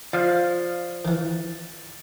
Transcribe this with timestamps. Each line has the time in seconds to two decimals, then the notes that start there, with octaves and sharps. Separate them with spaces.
0.13 F3 D5 F5
1.05 D#3 E3